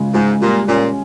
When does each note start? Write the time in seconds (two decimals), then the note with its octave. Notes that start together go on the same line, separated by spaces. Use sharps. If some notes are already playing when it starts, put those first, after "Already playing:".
Already playing: C#3 G#3
0.14 G#2 G#3
0.42 A#2 G3
0.69 A#2 C#4